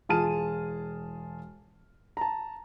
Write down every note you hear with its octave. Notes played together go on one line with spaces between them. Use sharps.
E1 F4 G#4 A5 F6 D#7
A5 A#5